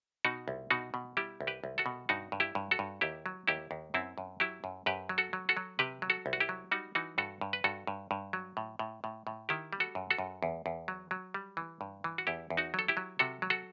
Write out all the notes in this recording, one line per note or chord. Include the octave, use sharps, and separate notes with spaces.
B2 D#4 F#4
C2
B2 D#4 F#4
B2
G3 E4 G4
C2
G4 B4
C2
F#4 A4
B2
G2 D#4 F#4
G2
E4 G4
G2
F#4 A4
G2
D#2 E4 G4
F#3
D#2 E4 G4
D#2
F#2 C4 E4
F#2
F#3 E4 G4
F#2
F#2 G4 B4
F#3
F#4 A4
F#3
F#4 A4
F#3
C3 G4 B4
F#3
F#4 A4
C2
F#4
E4 G4
F#3
G3 D#4 F#4
E3 D#4 F#4
G2 F#4 A4
G2
B4
G2 F#4 A4
G2
G2
F#3
A2
A2
A2
A2
D#3 E4 G4
G3
F#4 A4
F#2
F#4 A4
F#2
E2
E2
F#3
F#3
G3
E3
G2
E3
F#4
E2 E4 G4
E2
D#4 F#4
F#3 A4
E4 G4
F#3
C3 F#4 A4
F#3
F#4 A4